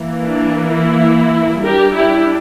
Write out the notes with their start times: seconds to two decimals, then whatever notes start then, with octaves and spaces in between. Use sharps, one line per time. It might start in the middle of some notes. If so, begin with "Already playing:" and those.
Already playing: E3 A#3
0.24 D4
0.71 E4
1.63 G3 D4 G4 A#4
1.93 E4 G4